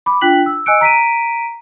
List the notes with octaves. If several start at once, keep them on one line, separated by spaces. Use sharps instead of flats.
B5 D6
D4 F4 G5 F#6 B6 F#7
E6
D#5 G#5 E6 F#6 C#7 D7
A#5 B6 D7 D#7